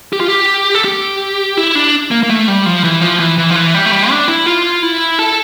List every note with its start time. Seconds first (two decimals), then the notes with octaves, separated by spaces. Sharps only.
0.13 G4
0.21 F4
0.28 G4
0.74 A4
0.84 G4
1.57 E4
1.75 D4
2.11 A#3
2.23 A#3
2.30 A3
2.48 G3
2.66 F3
2.84 E3
3.01 F3
3.20 E3
3.38 E3
3.51 F3
3.56 E3
3.74 G3
3.86 A3
3.92 G3
4.10 D4
4.28 E4
4.46 F4
4.83 E4
5.19 A4